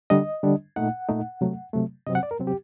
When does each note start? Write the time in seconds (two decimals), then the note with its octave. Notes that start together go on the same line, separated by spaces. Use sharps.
0.10 D3 G3 D4 D#5
0.43 D3 G3 D4
0.76 A#2 A3 D#4 F#5
1.09 A#2 A3 D#4
1.41 C3 F#3 A3
1.73 C3 F#3 A3
2.06 C3 F#3 C4 D#5
2.15 F#5
2.23 D5
2.31 A#4
2.39 C3 F#3 C4
2.47 G4